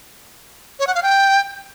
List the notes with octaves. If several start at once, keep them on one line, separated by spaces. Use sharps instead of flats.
C#5
F#5
F5
G5